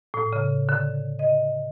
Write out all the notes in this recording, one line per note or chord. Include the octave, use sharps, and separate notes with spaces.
A2
C#3
D3
D#5